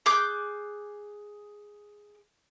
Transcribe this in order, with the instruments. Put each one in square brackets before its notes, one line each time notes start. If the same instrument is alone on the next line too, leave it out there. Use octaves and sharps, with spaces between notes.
[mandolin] G#4 D6 F#6 G6